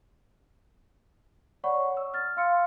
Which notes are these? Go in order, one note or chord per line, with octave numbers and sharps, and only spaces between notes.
C#5 D5 F#5 B5 C#6
E6
F6 A6
F5 C6 E6 F6 C#7